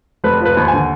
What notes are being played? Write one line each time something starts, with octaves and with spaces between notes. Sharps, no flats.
F1 B4
F3 B4
D#2
G#5
D3